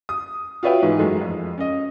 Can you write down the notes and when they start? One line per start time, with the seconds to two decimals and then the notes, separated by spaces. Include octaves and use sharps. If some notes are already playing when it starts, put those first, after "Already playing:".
0.09 D#6
0.63 F4 F#4 B4 C#5 E5 G5
0.82 G#2 E3
0.99 F#2 F#3 G#3 A3
1.22 F2
1.58 C#4 D#5